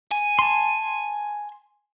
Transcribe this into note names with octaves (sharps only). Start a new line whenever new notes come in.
G#5
A5 C6